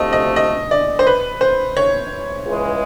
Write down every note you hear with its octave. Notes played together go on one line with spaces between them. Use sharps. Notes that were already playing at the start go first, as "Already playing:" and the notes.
Already playing: D2 C3 F3 A3 D#5
D#5
D#5
D5
C5
B4
C5
C#5
C#2 C#3 E3 G#3